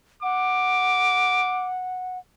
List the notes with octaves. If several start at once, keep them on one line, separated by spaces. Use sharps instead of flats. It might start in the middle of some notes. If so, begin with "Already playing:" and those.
F#5 D6